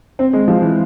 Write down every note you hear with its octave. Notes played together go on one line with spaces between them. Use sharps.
C4
G#3
F3
E3